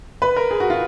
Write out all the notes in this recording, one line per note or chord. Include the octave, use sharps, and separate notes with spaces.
B4
A#4
G#4
F#4
F4